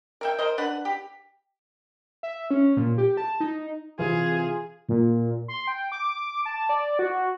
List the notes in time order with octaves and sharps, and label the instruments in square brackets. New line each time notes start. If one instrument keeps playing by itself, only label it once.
[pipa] A#4 E5 G5
A#4 C5 D#5
D4 B4 F#5
G4
[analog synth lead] E5
C#4
A#2
G4
A5
D#4
[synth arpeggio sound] C3 E3 [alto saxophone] F4 [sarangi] G#4
[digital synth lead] A#2
C6
G5
D6
A5
D5
F#4